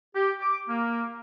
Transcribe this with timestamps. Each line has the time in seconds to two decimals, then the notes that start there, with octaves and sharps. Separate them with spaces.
0.15 G4
0.41 D6
0.69 A#3